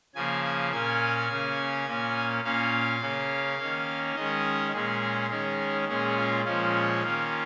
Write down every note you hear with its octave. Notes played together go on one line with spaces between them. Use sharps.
C#3 F3 A#3 G#5
G#5
A#2 A#3 C#4 G#5
C#3 A#3 C#4
A#2 A#3 C#4
A#2 A#3 C#4 F5
C#3 A#3 C#4
D#3 A#3 C#4
D#3 G#3 C#4 D#5
A#2 G#3 C#4 G#4
D#3 G#3 C#4
A#2 G#3 C#4 G#4
F4
A#2 F3 G#3 C#4 F4
D#3 A#3 C#4